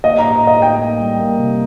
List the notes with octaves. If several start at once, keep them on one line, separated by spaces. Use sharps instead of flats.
A#3 D#5
A#5
A2
A2 D#5
A2 G5
A#3
G3
A#3
C3